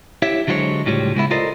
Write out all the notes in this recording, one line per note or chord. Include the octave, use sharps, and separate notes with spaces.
E4 G4 C#5 E5
D3 F#3 G#3 F4 C5 C#5
C#2 A2 G3 F4 C#5
C#3 G#3 B3 E4
F4 A4 A#4 C5 D5 D#5